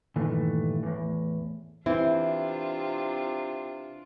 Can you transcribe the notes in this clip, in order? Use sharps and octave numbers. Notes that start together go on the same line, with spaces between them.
G2 A#2 D#3 E3 A3
E2 A2
C3 E3 C4 D4 F4